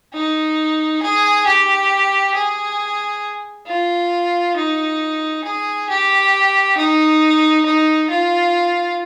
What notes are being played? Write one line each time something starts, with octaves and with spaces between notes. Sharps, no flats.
D#4
G#4
G4
G#4
F4
D#4
G#4
G4
D#4
D#4
F4